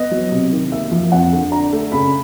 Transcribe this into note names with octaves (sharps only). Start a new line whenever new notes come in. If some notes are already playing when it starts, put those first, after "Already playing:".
Already playing: B3 D#5
F#3
C3
D#3
A#3 E5
F3
F2 F#5
D3
D4 A#5
A3
C#3 B5